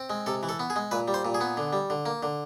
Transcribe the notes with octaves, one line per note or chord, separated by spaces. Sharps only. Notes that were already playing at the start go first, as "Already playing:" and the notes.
Already playing: C4
G#3
C3 A4
E3
A4
B3
G#4
G#3
A#2 B4
G3
C5
A#2
G#4
B3
D3
G3
D3
A#3
D3